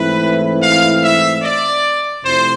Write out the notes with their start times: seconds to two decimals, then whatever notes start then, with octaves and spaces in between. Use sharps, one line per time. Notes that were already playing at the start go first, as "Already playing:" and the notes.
Already playing: G#2 E3 A3 C4 E4 B4
0.62 F5
1.03 E5
1.43 D5
2.24 F2 C3 F3 A3 E4 C5